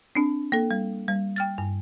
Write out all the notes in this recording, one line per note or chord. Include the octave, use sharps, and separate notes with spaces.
C4 D4
A#3 A4
G3
G3
G5 F6 A6
G2